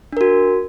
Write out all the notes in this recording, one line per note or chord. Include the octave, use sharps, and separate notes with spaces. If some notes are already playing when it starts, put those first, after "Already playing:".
D4 F#4 A#4